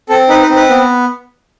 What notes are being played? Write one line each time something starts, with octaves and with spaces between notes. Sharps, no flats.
C4 A4
D#4 B4
B4
C4
B4
B3